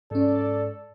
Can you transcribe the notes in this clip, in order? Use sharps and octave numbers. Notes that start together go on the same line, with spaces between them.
G#2 C#4 A4 D5